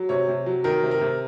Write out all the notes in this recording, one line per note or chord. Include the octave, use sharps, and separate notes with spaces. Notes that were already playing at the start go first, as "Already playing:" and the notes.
Already playing: F#3
C3 C#5
C3
F#3
D#3 A#4
C3
A#4
C3